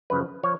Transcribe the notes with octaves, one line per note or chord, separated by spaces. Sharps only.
F#2 C#3 F3 B4
F3 C#5